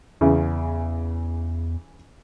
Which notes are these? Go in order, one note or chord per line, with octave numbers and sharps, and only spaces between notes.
E2 C#3 E3